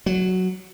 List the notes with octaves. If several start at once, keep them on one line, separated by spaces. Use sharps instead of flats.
F#3